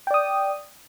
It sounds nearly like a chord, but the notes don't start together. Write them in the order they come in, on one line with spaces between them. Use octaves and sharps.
G5 D5 D#6